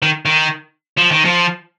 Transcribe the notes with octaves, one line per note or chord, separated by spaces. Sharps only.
D#3
D#3
F3
D#3
F3